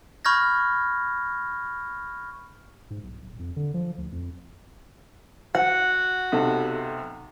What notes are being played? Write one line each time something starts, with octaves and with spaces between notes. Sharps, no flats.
B5 C#6 F6 G6 G#6 A#6
G#2
B1
D#1
F2
D3
F3
D2
F2
F#4 F#5
B1 C3 A4